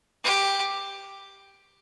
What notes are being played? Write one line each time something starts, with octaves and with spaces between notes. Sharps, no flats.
G4